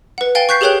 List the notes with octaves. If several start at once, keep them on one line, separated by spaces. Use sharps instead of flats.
B4 F#5
F5 G5 G#5 A6 G7
C#6 F#6 G6 B6 C7
G4 G#4 A#4 C#5 G5 F#6